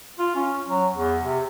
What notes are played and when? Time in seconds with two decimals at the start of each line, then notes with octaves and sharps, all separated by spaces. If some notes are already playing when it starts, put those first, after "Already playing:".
0.19 F4
0.35 C#4
0.68 F#3
0.96 E2
1.23 C3